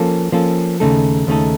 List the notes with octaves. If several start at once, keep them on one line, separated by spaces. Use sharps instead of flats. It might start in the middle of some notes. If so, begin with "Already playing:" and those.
Already playing: F3 A#3 C#4 A4
F3 A#3 C#4 A4
D#2 C#3 A3 D#4 A4
D#2 C#3 A3 D#4 A4